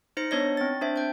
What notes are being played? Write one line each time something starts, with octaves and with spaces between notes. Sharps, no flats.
D#4 C5 A#6 C#7
B3 D4 C#5 D#5 A#6
C4 A6
D4 C5 E5
G5 G6